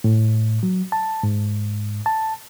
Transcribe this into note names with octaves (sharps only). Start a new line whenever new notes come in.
A2
F#3
A5
G#2
A5